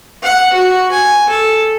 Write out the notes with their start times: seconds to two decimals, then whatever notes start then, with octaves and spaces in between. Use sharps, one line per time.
0.23 F#5
0.53 F#4
0.91 G#5
1.29 A4